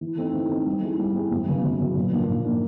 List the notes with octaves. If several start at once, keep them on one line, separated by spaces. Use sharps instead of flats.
E3
A3 C4 D#4
E3
A3 C4 D#4
G3
C4 E4 G#4
G3
C4 E4 G#4
F#2
C#3 F#3 B3
F#2
C#3 F#3 B3
A#2
F3 A#3 D4
A#2
F3 A#3 D4